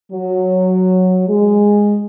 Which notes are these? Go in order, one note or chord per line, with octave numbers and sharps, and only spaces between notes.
F#3
G#3